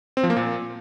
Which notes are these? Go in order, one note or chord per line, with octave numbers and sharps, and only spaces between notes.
C4
F3
A#3
A#2